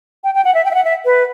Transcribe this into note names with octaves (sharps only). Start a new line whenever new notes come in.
G5
G5
F#5
E5
G5
E5
F#5
E5
B4